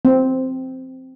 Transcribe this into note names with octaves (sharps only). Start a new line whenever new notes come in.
C4